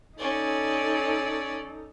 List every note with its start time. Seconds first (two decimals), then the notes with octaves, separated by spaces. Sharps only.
0.18 C#4 D#4 A4 D5